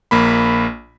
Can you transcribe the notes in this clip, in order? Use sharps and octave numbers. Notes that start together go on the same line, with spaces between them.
A#1 A#3 B5